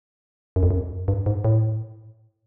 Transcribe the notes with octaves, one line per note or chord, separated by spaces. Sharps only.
F#2
F2
F#2
G2
G#2
A2